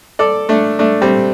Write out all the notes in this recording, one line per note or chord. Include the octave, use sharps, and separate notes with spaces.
A4 D5
A3 D4
A3 D4
G3 C4